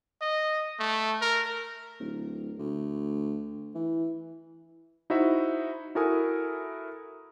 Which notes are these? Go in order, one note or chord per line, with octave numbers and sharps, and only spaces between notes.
D#5
A3
A#4
D1
D2
E3
D#4 E4 F#4 C5 E5
E4 F#4 A4 A#4 G#5 D#6